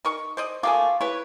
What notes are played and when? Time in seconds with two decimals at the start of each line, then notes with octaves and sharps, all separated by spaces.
0.05 D#4 A#4 C#6
0.37 C5 D5 D#5
0.63 A3 A#3 F4 G#4 D6
1.01 E4 B4 C#5